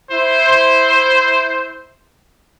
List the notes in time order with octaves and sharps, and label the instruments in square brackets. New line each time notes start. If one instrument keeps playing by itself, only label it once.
[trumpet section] E4 C5